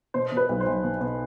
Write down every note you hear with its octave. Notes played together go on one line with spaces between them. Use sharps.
B2 C5
B2
B4
B1
C5
B1
B2
B2